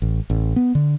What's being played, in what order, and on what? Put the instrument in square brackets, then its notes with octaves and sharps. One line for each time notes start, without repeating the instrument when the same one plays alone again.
[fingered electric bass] A1
A1
B3
D3